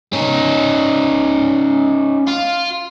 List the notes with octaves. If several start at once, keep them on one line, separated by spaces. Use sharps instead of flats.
C#4 D#4
F4